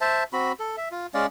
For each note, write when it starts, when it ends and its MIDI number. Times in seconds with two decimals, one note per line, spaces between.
0.01 0.24 72
0.01 0.24 76
0.01 0.24 81
0.33 0.52 60
0.33 0.52 66
0.33 0.52 83
0.60 0.76 69
0.77 0.89 76
0.91 1.07 65
1.14 1.26 56
1.14 1.26 61
1.14 1.26 74
1.14 1.26 77